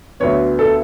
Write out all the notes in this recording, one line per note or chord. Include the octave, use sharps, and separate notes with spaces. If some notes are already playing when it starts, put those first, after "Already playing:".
D2 D3 F#3 B3 C#5
A4